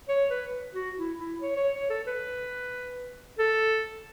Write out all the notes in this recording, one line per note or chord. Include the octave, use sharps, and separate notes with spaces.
C#5
B4
F#4
E4
E4
C#5
C#5
C#5
A4
B4
A4